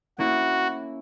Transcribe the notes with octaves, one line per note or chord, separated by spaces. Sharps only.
A#3 C#4 E4 F#4